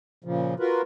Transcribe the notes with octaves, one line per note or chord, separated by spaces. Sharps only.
A#2 C#3 F3
F4 F#4 A#4 B4